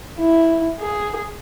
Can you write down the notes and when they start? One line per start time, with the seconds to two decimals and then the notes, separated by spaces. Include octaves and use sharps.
0.20 E4
0.80 G#4